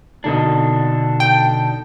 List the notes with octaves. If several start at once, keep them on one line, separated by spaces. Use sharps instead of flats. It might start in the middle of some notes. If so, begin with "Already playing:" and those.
B2 D3 D4 D#4 A4 D#5
G5